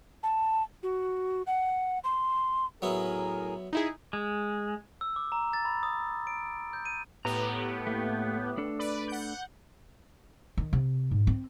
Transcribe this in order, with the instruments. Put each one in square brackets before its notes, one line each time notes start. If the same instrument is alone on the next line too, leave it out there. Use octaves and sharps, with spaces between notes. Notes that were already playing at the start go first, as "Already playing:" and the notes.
[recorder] A5
F#4
F#5
C6
[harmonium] A2 G#4 A#4 [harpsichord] F#3 B3 E4
[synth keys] D#4 E4 G#4
[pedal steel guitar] G#3
[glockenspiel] E6
D6
A#5
A6
B5
D#6
D7
G6
D#7
[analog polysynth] A2 B3 G4 [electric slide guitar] A#5
[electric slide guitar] A3 A#3
A3 D4 A4
[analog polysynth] B4 D5
F#5 G6
[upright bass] D#3
C3
G#2
C4